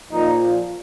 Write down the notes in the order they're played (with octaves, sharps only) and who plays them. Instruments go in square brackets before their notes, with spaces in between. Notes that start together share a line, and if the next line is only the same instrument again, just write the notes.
[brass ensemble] A#2 F3 D#4